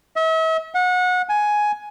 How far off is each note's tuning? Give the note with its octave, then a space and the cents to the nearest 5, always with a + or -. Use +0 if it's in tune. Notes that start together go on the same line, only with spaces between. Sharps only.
E5 -40
F#5 -30
G#5 +10